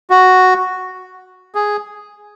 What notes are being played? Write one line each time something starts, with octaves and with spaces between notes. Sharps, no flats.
F#4
G#4